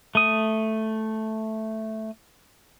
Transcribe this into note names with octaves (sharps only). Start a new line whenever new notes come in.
A3 D#6